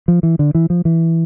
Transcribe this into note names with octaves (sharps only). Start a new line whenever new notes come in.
F3
E3
D3
E3
F3
E3